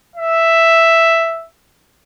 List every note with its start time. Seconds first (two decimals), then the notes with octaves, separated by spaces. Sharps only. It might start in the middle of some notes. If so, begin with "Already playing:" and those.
0.16 E5